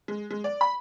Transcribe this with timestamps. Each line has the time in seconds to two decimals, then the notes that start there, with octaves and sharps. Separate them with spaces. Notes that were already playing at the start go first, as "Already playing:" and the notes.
0.08 G#3
0.31 G#3
0.44 D5
0.61 B5